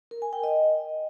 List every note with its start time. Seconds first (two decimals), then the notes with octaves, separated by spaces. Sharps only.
0.11 A#4
0.22 G#5
0.33 G5
0.44 D#5